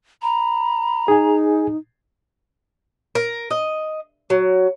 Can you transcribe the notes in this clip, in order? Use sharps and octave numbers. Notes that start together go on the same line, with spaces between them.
A#5 B5
D#4 G#4 G#5
A#4
D#5
F#3